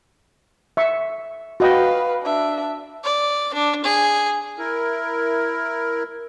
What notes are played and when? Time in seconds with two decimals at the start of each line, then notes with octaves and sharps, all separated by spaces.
0.77 E5 C#6
1.60 F#4 B4 D#5 F5 G5
2.23 D4 E5
3.04 D5
3.54 D4
3.84 G#4
4.58 E4 A#4